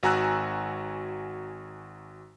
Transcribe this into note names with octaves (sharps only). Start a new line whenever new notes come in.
G#1 F#4 G#5 A#5 E6 F#6